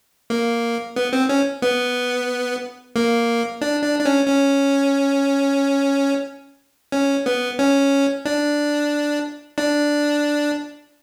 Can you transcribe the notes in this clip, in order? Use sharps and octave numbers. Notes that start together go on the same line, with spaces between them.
A#3
B3
C4
C#4
B3
A#3
D4
D4
D4
C#4
C#4
C#4
B3
C#4
D4
D4